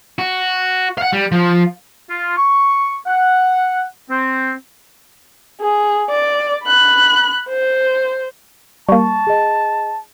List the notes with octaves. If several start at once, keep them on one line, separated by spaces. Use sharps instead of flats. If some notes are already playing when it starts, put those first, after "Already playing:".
F#4
F5 F#5
G3
F3
F4
C#6
F#5
C4
G#4
D5
B5 F#6
C5
G3 A#3 A5 C#6
G#4 D#5